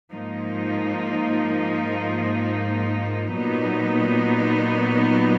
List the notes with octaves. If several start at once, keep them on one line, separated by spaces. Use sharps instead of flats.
G#2 F3 A#3 D#4
A#2 F#3 B3 D#4